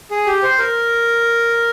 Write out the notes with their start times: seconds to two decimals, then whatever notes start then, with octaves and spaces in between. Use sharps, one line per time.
0.11 G#4
0.26 G4
0.43 C5
0.59 A#4